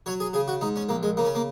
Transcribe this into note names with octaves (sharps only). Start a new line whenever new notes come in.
F#3 C#5
G#4
C#3 G#4
F#4
G#2 D#4
C#4
A#1 A#3
G#3
C#3 A#3
C#4
A#3